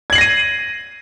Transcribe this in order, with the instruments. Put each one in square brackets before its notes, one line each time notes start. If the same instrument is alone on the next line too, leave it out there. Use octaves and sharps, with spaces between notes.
[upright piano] G#6
F#7
C7
A#6
D#7